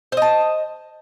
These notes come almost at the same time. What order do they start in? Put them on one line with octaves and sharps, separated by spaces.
C5 D#5 A5